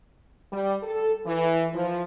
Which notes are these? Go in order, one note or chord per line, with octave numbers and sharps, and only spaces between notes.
G3
A4
E3
F3